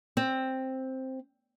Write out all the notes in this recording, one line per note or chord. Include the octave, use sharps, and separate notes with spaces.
C4